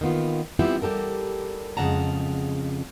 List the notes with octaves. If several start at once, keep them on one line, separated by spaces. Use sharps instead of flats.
D#3 A#3 B3 F4
G3 B3 C4 E4 F4 G4
G3 G4 A4 A#4
F2 C#3 G#3 F#5 A5 A#5